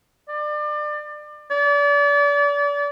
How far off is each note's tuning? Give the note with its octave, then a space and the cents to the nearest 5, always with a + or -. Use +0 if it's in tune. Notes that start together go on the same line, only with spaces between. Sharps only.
D5 +30
D5 -35